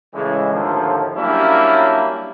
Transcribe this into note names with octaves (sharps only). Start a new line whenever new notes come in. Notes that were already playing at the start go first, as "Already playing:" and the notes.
A2 C#3 E3 G#3
D#2 A2 D3 F3
F#3 G3 A#3 C#4 D4 E4